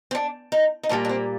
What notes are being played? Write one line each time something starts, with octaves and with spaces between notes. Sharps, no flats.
C4
D4
D#4
D#4
A#2 G3 A#3 D4
D4
C4